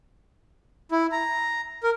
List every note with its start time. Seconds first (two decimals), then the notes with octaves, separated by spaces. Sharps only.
0.92 E4
1.12 A#5
1.83 A#4